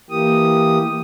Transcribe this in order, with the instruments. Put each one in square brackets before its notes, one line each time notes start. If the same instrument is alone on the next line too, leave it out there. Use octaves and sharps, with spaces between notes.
[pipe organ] E3 A#3 G4 D#6